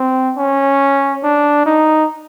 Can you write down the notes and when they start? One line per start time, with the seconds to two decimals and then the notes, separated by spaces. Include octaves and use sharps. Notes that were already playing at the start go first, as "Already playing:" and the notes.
Already playing: C4
0.37 C#4
1.23 D4
1.66 D#4